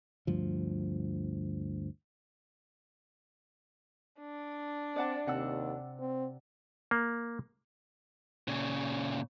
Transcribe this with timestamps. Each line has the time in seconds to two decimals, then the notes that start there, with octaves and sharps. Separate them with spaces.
0.27 D2 G2 F3
4.19 D4
4.96 C4 D5 F#5 A5
5.27 D#2 C3 F#5 E6
6.00 C4
6.91 A#3
8.48 A#2 C#3